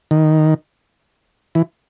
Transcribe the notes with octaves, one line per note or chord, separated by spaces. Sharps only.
D#3
E3